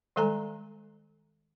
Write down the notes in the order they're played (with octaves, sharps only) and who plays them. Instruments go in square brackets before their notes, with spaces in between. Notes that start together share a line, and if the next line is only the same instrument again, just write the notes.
[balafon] D#3 G3 G#3 A4 G#5 A#5